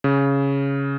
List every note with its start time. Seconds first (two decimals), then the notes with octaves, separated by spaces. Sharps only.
0.04 C#3